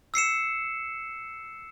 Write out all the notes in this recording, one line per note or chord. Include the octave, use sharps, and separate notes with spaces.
E6 C7 C#7 E7